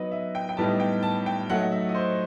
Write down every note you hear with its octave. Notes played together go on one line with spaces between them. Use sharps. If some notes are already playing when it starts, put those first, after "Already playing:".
Already playing: F#3 B3 D#4 B4 D#5
E5
G5
G5
A2 G3 B3 D#4 A5
G5
A5
G5
F#3 A3 D#4 F#5
F#5
E5
D#5
C5